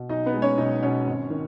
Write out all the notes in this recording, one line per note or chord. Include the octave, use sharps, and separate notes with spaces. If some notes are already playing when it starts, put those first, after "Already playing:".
Already playing: B2
B1 D#4 D#5
B3 B4
G#3
C#4 C#5
B1 D#4 D#5
B2 C#4 C#5
G#1
D#3